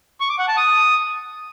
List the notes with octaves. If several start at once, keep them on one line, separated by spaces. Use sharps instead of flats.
C#6
D6
F#5
A5
D#6